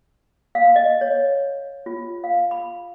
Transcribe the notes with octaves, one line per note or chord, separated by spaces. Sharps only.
F5
D#5
C#5
F4
F5
B5